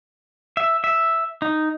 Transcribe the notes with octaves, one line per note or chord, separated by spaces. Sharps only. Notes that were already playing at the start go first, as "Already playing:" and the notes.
E5
E5
D#4